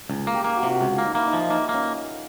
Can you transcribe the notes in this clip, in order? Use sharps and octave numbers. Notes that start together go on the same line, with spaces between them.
C#2 G#4
A#3
G4
A#3
F#4
C3 F4
F#4
C#2 F4
A#3
D#4
A#3 E4
D#4
F3
A#3 D#4
A#3
C#4